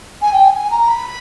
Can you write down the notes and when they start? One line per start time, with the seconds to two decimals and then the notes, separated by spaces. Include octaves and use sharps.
0.21 G#5
0.32 G5
0.43 G#5
0.54 G#5
0.70 A#5
0.87 B5